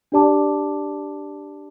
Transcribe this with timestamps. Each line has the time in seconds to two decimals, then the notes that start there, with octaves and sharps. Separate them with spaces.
0.12 D4 G4 D5 A5 D6